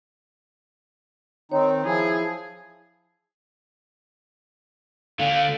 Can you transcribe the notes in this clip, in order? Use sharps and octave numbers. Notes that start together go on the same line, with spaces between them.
D#3 C4 D#4 C#5
F3 E4 G#4
D3 A3 F5